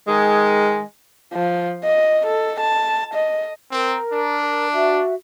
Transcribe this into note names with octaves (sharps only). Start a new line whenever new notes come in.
D#3 G#3
F3
D#5
A4
A5
D#5
C4 A#4
D4
F#4 E5